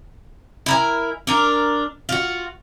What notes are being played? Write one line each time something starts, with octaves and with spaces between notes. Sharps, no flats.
E4 A#4 G#5
D4 A#4
F4 F#4